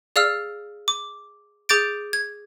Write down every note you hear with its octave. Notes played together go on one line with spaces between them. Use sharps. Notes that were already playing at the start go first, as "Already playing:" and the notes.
G#4 D5 F5 E6 F6
D6
G#4 D6 G6 A6 D7
G#6